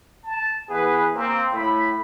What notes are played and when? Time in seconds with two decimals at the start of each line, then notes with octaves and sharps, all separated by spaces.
0.24 A5
0.70 E3 B3 G#4 B4
1.15 A#3 C4
1.53 A2 B5